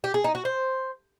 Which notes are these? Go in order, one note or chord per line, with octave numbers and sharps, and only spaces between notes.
G4
G#4
D#4
F#4
C5